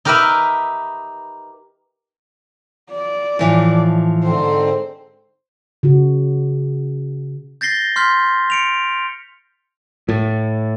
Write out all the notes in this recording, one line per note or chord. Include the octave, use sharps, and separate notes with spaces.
D#4 G4 A#4 B4 E5 B5
D5
A2 E3 F3
G#2 D3 C4 C5
C#3 F#4
G6 A6 A#6 C7 G7
C6 F6 G6 B6
C#7 D7 F7
A2